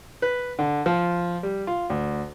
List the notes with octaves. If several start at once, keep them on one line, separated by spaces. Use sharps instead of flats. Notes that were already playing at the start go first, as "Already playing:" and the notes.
B4
D3
F3
G3
F4
D2